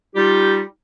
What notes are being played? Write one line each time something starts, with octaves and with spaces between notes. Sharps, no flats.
G3 D#4 F4 G4